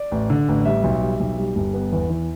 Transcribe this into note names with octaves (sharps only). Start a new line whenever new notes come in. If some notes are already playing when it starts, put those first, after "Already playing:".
Already playing: D5
A1
D3
A1
G3 E5
B1
G3
B1
G3
G1
B3
E2
E3